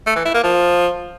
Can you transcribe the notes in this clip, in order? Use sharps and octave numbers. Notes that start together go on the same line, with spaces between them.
A3
E3
E4
A#3
F3